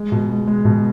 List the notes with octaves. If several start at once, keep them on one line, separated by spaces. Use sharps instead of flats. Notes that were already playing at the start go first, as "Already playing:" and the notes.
Already playing: G#3
B2
G#3
G#3
B2